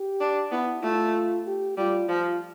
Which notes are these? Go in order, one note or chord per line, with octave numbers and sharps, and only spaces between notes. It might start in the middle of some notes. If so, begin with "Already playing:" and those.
Already playing: G4
D4
B3 E4
A3 F4
G4
G3 F4
F3 F4